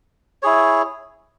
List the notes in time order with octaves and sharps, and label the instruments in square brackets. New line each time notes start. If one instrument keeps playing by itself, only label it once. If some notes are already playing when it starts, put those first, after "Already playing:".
[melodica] E4 G#4 C#5